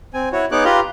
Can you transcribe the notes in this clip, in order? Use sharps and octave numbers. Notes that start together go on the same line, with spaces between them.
C4 G#5
E4 F#4 C#5
B3 D#4 G#4 C#5 D6 F#6
F4 G4 B4 F5 A#5 C6